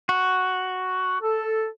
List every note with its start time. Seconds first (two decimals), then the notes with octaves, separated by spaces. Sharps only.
0.09 F#4
1.22 A4